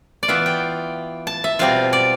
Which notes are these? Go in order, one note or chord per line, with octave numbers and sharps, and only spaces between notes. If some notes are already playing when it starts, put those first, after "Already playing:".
D5
E3 B3 F4 E5
G5
A5
E5
B2 G3 C4 F4 F5
D5